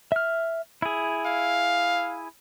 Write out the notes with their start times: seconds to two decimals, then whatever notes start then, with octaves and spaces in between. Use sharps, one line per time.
0.12 E5 F6
0.82 E4 G#4
1.26 F5